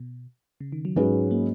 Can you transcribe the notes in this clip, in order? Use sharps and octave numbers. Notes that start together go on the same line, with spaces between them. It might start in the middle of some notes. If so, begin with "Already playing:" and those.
Already playing: B2
C#3
D#3
F#3
G#2 F#3 G#3 C#4 G#4 B4
A#3